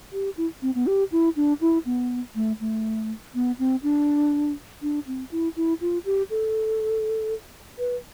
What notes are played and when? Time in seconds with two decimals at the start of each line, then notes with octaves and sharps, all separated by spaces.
0.13 G4
0.37 E4
0.62 C4
0.75 B3
0.87 G4
1.12 E4
1.36 D4
1.61 E4
1.85 B3
2.35 A3
2.60 A3
3.34 B3
3.59 C4
3.83 D4
4.82 D4
5.07 C4
5.31 E4
5.56 E4
5.81 F4
6.05 G4
6.30 A4
7.79 B4